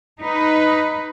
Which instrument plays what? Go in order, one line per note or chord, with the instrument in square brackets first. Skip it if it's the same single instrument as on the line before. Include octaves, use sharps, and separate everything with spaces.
[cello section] D#4 B4